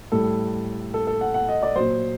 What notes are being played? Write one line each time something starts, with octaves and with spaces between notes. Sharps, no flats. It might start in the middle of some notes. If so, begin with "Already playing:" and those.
A2 G3 A4
A4
A4
F#5
F#5
D#5
D5
A#2 F#3 C5